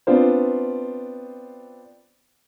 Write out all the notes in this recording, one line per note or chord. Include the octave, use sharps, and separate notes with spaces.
B3 C4 D4 F4 C5